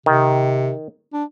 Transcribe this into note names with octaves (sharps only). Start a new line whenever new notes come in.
C3 D#3
D4